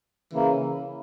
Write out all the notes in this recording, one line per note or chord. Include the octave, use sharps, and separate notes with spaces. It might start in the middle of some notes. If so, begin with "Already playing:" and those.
C#3 E3 A#3